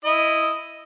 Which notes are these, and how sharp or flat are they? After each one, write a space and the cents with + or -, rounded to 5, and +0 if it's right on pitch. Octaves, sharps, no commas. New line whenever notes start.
E4 +0 D#5 +0